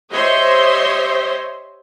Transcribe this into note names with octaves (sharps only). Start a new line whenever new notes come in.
G4 C5 C#5 D#5 E5 C6